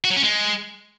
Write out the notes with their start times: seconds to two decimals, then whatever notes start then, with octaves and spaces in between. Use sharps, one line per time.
0.04 F#4
0.10 F#3
0.17 C#4
0.23 G#3